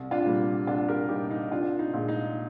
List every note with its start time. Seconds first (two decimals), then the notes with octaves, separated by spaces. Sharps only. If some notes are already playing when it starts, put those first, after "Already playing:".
Already playing: C2
0.11 D4 F4
0.25 A#2 G3 A#3
0.67 C2 D4 F4
0.89 G4 A#4
1.09 A#2 G3 A#3 D#4 G4
1.31 D#4
1.52 C2 D4 F4
1.79 D#4
1.94 A#2 G#3
2.08 D#4